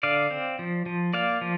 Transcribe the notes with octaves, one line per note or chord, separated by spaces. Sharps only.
D3 D5 F5
C4
F3
F3
A#3 D5 F5
F3